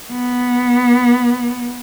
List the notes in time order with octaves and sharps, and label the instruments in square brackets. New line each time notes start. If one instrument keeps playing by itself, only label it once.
[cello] B3